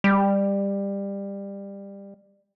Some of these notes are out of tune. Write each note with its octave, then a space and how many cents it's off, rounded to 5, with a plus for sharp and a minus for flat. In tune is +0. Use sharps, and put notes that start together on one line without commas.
G3 +20